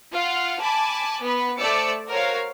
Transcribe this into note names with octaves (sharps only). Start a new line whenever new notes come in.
F4 F5 F#5
G#5 A5 B5 D6
B3 B4
A3 C5 D5 D6 E6 C#7
F#4 A#4 C5 C#5 F5